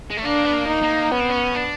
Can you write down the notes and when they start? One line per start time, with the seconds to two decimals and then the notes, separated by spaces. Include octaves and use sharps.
0.10 G#3
0.17 A3
0.24 A#3 D4
0.45 B3
0.53 A#3
0.67 D#4
0.82 A#3
1.11 B3 C#4
1.20 C4
1.29 C#4
1.55 D4